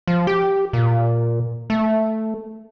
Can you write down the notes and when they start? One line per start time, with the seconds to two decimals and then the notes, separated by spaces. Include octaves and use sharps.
0.07 F3
0.27 G4
0.73 A#2
1.70 A3